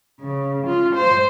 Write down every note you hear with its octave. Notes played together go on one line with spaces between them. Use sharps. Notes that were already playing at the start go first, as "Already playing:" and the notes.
C#3
F4
C5